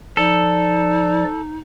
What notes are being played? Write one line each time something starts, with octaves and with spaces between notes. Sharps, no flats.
F3 D#4 A4 D5